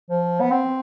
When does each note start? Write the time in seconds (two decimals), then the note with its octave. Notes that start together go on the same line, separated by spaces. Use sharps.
0.10 F3
0.41 B3
0.51 C4